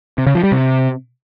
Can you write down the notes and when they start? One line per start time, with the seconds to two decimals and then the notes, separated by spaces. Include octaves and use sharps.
0.18 C3
0.27 C#3
0.35 F3
0.43 G3
0.52 C3